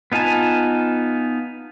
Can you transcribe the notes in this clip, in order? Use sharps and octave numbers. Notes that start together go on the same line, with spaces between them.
B3 D#4 F4 G#5 A5